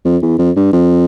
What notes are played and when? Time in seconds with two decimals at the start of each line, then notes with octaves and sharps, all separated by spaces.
0.05 F2
0.22 E2
0.39 F2
0.56 G2
0.73 F2